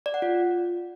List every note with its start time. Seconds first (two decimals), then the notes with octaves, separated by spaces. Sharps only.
0.06 D5
0.14 F#5
0.22 F4